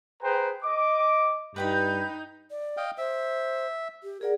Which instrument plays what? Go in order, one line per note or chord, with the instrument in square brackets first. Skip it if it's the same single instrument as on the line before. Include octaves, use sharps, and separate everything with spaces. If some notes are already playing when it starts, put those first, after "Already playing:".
[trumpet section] G#4 B4 C5 G5 A#5
D#5 D6
[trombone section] G2 [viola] D#4 [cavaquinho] B4 G5 B5 [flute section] G6
[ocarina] D5
[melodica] D#5 F5 G5
[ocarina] C5 [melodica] E5
[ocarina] G4
[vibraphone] G#4 D5 F#5 [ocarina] A#4